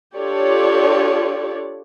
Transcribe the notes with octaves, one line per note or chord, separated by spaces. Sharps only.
D4 F4 G4 A4 C#5 D5